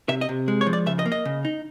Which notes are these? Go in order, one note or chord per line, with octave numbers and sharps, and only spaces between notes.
C3 E5
D#5
C3
G#3
C#5
F3
D5
C#3 E5
D#5
A#3
D#5
C#3
D#4